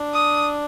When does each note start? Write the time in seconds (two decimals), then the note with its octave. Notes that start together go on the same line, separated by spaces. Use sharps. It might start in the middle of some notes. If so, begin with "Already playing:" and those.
Already playing: D4
0.14 D#6